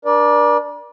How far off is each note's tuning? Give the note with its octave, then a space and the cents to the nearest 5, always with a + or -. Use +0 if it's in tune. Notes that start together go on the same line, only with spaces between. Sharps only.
D4 +0 A#4 +45 D5 +0